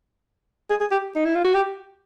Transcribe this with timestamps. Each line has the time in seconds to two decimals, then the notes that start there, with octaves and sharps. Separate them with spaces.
0.70 G#4
0.81 G#4
0.91 G4
1.16 D#4
1.25 E4
1.35 F4
1.44 F#4
1.55 G4